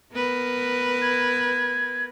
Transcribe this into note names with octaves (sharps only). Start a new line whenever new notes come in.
B3 A#4 B4
G#6